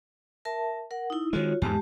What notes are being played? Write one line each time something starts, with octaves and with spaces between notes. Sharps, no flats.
A#4 E5 A5
A#4 F#5
D#4 E4
D#3 G#3 F4 F#4 C#5
E2 G#2 G#3 G4 A5